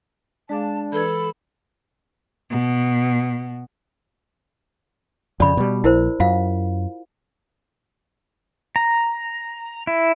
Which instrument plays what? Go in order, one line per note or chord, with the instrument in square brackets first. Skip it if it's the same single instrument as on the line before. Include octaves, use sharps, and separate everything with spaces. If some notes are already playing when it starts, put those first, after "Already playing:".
[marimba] G#3 G#4 F5 [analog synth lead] D4 [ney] A5
[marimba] E3 B4 G#6 [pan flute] A4 [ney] B5
[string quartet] B2
[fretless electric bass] F2 C#3 [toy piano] D5 B5
[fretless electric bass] B2 G3
[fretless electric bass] A#1 [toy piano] E4 A#4 C5
[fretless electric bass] F#2 [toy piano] F4 F5
[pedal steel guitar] A#5
E4